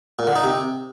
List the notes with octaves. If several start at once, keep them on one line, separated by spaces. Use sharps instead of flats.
A#2
D3
D#4
C3